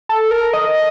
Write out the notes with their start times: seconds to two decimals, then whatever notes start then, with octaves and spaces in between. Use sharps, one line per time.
0.09 A4
0.31 A#4
0.53 D#5